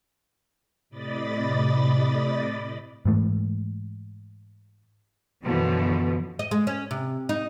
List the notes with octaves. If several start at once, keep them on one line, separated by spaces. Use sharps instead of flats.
A2 C3 D5 D#5 B5 A6
G#2 E3 A3
F#2 B2 D3 E3 F3
D#5
G#3
C#4
C3
D#4